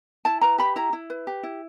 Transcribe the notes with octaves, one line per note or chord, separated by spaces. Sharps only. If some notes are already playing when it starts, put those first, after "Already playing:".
E4 A5
B4 A#5
G4 B5
E4 A#5
E4
B4
G4
E4